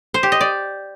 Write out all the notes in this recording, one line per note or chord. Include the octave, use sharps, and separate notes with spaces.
C5
G4
D#5
D5